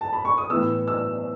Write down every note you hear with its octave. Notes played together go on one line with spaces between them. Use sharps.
A5
B5
C#6
D#6
A2 E3 B3 E6
E6